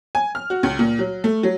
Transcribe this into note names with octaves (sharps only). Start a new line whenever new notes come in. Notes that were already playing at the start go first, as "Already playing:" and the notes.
G#5
F6
F#4
C#2
A#2
F#3
A3
F#3